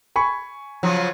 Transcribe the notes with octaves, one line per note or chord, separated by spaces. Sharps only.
G#5 B5 C#6
C#3 F3 F#3